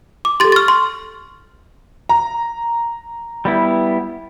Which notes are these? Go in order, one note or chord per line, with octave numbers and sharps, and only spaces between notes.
D6
G4 A4 C6 A6
C#6 F6 A6
C6
A#5
G3 B3 E4